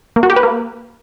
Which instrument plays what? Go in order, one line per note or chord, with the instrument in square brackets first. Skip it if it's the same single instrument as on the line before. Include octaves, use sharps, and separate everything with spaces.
[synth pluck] A#3
F#4
G4
B4
A#3